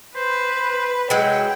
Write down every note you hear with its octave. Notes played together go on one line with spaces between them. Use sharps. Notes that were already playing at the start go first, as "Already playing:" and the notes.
B4 C5
F#3 G#3 E4 G5